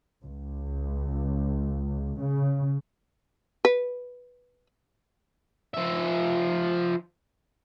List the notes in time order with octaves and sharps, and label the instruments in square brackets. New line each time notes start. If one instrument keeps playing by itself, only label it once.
[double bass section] C#2
C#3
[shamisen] B4
[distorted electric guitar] F3 E5